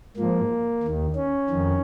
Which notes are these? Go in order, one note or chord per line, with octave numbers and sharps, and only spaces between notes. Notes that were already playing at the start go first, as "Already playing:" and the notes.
G#2 F3 A#3
D#2 D#3
C#4
F2 D#3